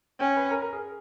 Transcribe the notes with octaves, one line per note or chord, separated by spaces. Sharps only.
C#4 G5
B4
A#4
A#4
G#4